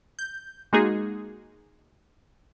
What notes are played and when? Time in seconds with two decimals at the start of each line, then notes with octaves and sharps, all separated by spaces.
0.19 G6
0.73 G#3 A#3 D#4 F#4 G#4